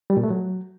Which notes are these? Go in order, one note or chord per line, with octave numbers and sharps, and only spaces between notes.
G3
A#2
A3
F#3